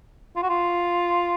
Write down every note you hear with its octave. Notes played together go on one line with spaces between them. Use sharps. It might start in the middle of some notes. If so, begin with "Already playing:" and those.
F4
F#4
F4